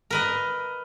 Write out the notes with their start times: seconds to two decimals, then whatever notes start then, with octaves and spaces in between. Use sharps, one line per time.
0.10 A#4 B4 D#5